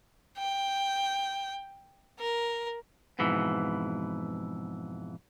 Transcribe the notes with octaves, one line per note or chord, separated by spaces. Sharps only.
G5
A#4
F2 G#2 B2 E3